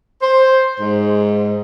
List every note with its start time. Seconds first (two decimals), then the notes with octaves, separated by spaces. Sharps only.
0.22 C5
0.80 G#2